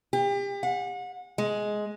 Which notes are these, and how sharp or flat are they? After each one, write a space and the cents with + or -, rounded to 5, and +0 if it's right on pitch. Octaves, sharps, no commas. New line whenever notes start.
G4 +35
F#5 -35
G#3 +10